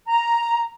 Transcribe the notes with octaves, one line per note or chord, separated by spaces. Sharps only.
A#5